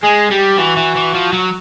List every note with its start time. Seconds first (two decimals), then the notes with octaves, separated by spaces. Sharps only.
0.03 G#3 G#4
0.31 G3 G4
0.58 E3 F#4
0.77 E3
0.95 E3
1.14 F3
1.33 F#3